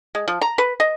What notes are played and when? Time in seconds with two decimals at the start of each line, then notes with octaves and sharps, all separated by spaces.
0.15 G#3
0.28 F3
0.41 A#5
0.58 B4
0.80 D#5